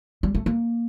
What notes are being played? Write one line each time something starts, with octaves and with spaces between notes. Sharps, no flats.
G3
A3
A#3